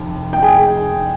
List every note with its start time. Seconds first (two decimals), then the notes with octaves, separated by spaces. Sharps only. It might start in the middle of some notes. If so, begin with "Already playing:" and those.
Already playing: F1 D#2
0.33 G5
0.42 G#4 G#5